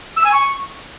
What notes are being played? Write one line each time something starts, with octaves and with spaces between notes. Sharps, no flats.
E6
G#5
C#6